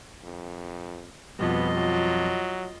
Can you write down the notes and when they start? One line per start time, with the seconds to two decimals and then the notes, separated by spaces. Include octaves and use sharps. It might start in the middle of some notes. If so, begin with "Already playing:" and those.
0.24 F2
1.39 F2 B2 G3 B3 F4 D#5
1.77 F#3